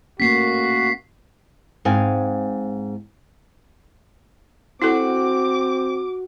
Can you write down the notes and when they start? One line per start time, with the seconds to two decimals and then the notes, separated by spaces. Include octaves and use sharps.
0.20 A3 A#3 C#4 F#4 B6 C7
1.85 G#2 C4 F5 G#5
4.82 C4 E4 F#4 A4 D6